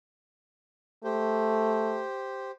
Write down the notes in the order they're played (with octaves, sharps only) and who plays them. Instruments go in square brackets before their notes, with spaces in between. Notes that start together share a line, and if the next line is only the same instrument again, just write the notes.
[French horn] A3 [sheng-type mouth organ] G4 C5